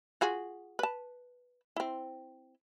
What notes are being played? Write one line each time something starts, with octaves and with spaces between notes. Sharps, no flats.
F4 F#4 G#4
B4 A5
C4 E4